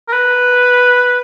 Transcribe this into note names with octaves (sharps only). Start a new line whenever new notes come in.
A#4
B4